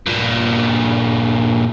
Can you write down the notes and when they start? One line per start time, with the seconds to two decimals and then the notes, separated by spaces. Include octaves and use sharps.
0.07 G2 A#2